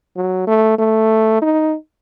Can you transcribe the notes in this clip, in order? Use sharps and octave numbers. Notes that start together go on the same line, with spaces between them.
F#3
A3
A3
D#4